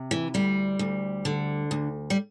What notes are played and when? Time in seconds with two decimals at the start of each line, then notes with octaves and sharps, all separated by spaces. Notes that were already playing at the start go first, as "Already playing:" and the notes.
Already playing: C3
0.11 E3
0.34 D2 G3
0.79 D2
1.25 D3
1.71 D2
2.10 G3